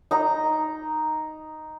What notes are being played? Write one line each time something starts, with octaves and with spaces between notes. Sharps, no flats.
D#4 A#5